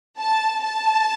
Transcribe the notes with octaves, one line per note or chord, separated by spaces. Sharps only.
A5
A5